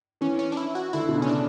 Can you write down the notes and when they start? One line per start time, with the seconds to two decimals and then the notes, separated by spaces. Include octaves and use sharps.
0.21 E3 C#4
0.39 C#4
0.52 D4
0.57 E4
0.75 F#4
0.93 D3 E4
1.09 B2
1.17 C#3 C#4
1.29 D4